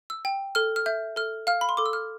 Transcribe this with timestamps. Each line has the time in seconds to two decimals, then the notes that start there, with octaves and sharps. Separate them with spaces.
0.10 E6
0.25 G5
0.55 A4 F6
0.76 F6
0.86 E5 G6
1.16 A4 F6
1.47 F5 F6
1.61 B5
1.69 C6
1.77 A4 D6
1.86 E6
1.93 F6